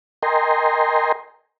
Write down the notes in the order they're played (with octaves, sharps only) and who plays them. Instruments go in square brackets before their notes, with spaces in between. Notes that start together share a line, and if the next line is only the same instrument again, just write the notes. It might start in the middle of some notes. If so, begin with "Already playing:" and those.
[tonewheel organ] A#4 D#5 G5 G#5 A#5 C6